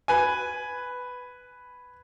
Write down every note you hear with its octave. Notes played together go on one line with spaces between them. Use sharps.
B4 G#5